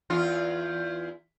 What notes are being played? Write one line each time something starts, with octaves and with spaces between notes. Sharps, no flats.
E2 F4